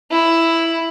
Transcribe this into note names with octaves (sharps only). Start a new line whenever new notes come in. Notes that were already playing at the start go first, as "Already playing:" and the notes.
E4